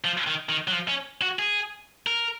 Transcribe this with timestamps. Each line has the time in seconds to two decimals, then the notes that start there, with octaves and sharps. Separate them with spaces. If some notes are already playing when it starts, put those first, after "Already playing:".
0.04 F3
0.27 D#3
0.49 D#3
0.68 F#3
0.72 F3
0.88 C#4
1.22 F#4
1.39 G#4
2.07 A#4